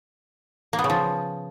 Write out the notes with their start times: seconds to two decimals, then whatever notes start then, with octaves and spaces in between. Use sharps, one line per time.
0.73 A#3
0.79 B3
0.84 C#3
0.90 F3